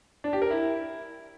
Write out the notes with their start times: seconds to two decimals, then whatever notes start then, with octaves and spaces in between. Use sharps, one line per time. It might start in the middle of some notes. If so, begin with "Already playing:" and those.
0.24 D4
0.33 G4
0.42 A#4
0.50 E4